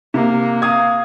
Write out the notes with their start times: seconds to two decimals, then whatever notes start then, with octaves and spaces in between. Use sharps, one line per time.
0.14 C3 A#3
0.62 F5 D#6 G#6